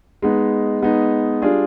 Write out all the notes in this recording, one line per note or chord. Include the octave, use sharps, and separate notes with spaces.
G#3 B3 D#4
G#3 B3 D#4
G3 D4 F4 G#4